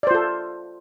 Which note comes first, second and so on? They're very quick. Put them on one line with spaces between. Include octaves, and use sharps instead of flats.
D5 C5 F4 A4